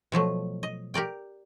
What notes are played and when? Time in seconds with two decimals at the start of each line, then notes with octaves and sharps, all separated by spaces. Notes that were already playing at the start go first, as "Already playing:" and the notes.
0.12 B2 F3 F#3 A3
0.63 D#5
0.94 G4 A#4 D5 G5